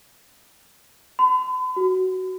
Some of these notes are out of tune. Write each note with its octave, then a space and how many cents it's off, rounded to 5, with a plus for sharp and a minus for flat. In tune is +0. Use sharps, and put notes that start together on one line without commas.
B5 +45
F#4 +15